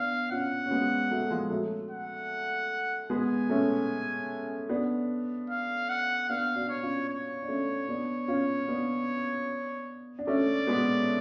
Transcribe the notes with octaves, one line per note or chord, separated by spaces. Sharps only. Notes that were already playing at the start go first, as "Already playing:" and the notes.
Already playing: B3 D4 F5
C#4 F4 F#5
C#4
G#3 B3
F#3 A3
F3 G#3
F#3 A3
F#5
G#3 B3 G#5
A3 C#4
B3 D4
F5
F#5
B3 D4 F5
D4 F#4
C#5
C#4 F4
C#5
D4
A3 C#4
B3 D4
C#4 F4
B3 D4
D4
A3 C#4 D5
G#3 B3